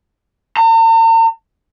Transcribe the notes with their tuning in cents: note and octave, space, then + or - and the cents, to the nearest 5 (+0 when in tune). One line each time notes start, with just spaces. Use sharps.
A#5 -45